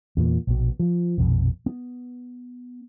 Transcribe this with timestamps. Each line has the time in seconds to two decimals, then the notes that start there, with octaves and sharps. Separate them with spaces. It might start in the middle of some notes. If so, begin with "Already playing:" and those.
0.17 E2 A#2
0.47 A#1 B2
0.79 F3
1.18 A#1 F2 B2
1.66 B3